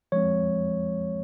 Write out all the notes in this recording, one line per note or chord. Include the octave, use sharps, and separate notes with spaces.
F3 G#3 C4 C#5